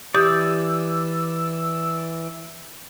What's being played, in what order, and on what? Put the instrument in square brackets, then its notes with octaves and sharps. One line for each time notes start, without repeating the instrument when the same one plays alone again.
[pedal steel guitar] E3 D5 [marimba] G4 D#6 G6 [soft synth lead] E6